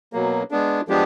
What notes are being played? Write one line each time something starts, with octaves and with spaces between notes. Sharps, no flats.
B2 F#3 A#3
G#3 B3 D4
F3 G#3 B3 D4 G4